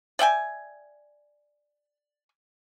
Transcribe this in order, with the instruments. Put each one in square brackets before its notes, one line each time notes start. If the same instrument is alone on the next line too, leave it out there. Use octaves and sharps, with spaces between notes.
[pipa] D5 E5 G5 G#5